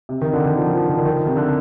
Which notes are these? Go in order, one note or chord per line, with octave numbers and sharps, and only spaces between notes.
C3
D#3
D3
D#3
F3
D#3
F3
D#3
D3
D#3
C3
D3